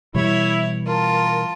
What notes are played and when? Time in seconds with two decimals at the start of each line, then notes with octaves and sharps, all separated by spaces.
0.15 B2 E3 G3 E4 C#5
0.86 F4 A#4 A5